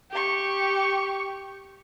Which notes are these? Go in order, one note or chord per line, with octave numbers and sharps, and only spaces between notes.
G4 C#6